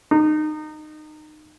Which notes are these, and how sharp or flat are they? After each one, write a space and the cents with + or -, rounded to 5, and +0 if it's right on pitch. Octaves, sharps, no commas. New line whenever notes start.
D#4 -25